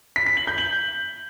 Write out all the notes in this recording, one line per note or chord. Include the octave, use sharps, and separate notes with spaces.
B6
B6
F#7
G6
F#7